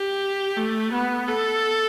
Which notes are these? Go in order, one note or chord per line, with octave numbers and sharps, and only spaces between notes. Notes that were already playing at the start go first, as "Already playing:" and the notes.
Already playing: G4
A3
B3
A4